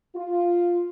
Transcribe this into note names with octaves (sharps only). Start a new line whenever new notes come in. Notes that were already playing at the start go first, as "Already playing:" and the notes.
F4